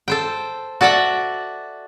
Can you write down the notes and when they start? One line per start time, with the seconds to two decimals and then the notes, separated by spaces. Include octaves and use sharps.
0.08 A4 C5 G5
0.81 F#4 A4 D5 E5 F#5